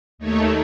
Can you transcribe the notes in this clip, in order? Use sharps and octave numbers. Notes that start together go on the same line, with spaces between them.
D#2 D#3 A3 C#5